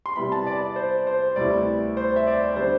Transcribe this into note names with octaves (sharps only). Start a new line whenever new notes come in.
C6
C3 G3 B3 E4 B5
A5
D5
D5
C5
C5
D2 C3 G3 B3 E4 D5
C5
E5
D5
D3 G3 B3 D4 C5